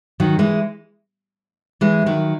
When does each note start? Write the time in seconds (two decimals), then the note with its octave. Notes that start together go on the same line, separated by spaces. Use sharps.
0.20 D#3 F#3
0.39 E3 G#3
1.81 E3 G#3
2.06 D#3 F#3